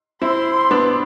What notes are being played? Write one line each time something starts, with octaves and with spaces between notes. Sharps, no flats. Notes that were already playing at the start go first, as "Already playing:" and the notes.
C4 E4 C6
B3 D4